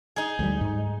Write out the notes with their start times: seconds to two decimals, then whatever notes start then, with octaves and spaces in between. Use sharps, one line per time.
0.16 D#4 G#4
0.39 D2 F#3 G3
0.61 G#2